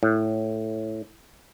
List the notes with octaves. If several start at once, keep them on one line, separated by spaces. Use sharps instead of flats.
A2